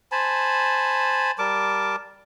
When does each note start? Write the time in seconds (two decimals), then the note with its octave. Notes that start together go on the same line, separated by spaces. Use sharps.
0.12 C5 G#5 A5 B5
1.39 G3 A#4 A5 D6